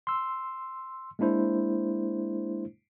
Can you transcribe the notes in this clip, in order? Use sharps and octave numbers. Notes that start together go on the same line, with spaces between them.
C6 E6
G#3 A#3 D4 E4 C5